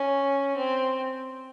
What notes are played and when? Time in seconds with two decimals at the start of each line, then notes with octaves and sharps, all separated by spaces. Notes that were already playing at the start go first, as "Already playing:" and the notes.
Already playing: C#4
0.57 C4